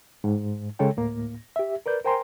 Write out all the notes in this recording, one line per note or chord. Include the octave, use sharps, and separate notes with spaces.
G#2
C#3 G#3 A4 C#5 G5
D2 A2 A#3
G4 E5
A#4 B4 D5 G6
A#4 C5 G5 G#5 A#5 C6